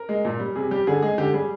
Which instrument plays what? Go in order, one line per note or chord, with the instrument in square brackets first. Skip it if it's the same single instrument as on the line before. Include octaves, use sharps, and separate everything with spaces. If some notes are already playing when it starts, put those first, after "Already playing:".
Already playing: [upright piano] A#4
G#3
A#2
G3
C3 G#4
G3 G4
D3 G#4
G#3 G#4
D3 G4
G3 G#4